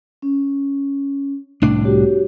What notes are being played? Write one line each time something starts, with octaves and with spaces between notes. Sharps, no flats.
C#4
C2 A2 D4
F#4 G4 C#5